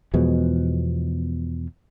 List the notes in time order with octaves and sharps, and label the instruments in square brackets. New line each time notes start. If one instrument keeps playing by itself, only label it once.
[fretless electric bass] E2 B2 F3 G#3